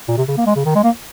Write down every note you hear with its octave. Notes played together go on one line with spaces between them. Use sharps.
A#2
C3
C#3
A#3
G#3
C#3
D#3
G#3
A#3